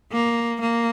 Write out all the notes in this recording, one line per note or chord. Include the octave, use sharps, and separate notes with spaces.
A#3
A#3